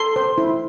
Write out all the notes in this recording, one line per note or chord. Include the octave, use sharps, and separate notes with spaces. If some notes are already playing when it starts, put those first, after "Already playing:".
Already playing: A4 C6
C5
E4